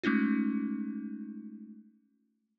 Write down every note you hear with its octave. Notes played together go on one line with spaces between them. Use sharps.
G#3 A3 C#4 D#4 F4